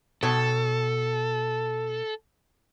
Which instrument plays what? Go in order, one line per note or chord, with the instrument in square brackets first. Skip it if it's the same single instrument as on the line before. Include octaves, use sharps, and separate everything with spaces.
[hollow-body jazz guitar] B2 C#5 [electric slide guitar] A4